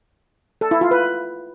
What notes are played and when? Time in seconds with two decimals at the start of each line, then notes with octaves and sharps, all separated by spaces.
0.61 A4
0.71 E4
0.81 F4
0.91 B4